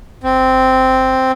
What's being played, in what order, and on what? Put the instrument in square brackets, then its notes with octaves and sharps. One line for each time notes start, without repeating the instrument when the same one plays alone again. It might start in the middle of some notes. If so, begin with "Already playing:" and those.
[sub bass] G1 [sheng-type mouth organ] C4